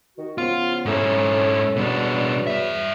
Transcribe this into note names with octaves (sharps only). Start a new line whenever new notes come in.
D#3 F#4
C#3 F3 B3 F4
G#2 C#4 E4 A4
E2 B2 F#3 G3 D4
G2 E5